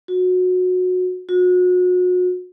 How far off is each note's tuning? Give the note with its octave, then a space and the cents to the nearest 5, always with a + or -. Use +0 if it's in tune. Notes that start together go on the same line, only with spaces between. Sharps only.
F#4 -20
F#4 -35